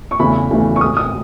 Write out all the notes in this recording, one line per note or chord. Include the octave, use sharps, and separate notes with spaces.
C#6
E2 C#3 E3 A3 B5
E2 C#3 E3 A3
C#6
A2 G#3 D#6
D#6